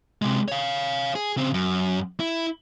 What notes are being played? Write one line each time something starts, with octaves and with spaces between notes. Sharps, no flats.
C3 G#3
C#5 F5
G#4
C#3 C4
F#2
E4